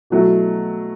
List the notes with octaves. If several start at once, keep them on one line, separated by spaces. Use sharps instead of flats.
B2 F#3 A3 E4